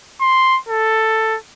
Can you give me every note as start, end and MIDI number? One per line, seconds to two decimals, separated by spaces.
0.21 0.58 84
0.69 1.37 69